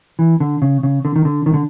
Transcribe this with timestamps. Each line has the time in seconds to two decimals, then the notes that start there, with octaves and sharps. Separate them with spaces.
0.19 E3
0.40 D3
0.62 C#3
0.83 C#3
1.05 D3
1.16 D#3
1.25 D3
1.46 D#3
1.54 D3